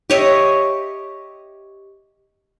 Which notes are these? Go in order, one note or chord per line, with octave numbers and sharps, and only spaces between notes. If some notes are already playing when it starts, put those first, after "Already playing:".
G4 C#5 D#5 E5